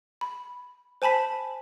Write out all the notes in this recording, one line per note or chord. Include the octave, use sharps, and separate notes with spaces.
B5
C5 G#5 A5 B5 B6